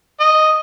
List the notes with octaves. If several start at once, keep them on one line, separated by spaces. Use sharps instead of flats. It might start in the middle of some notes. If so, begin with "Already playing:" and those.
D#5